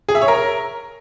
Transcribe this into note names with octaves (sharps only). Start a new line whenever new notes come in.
G#4
E5
C#5
A#4